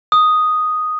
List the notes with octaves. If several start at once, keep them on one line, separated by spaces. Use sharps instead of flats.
D#6